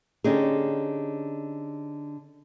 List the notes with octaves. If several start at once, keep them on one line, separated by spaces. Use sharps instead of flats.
D3 C#4 D#4 G4 G#4